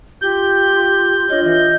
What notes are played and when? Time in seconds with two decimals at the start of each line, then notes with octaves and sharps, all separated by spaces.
0.22 F4 G4 G6
1.30 D4 F4 C#5 D#5
1.45 E3 D#5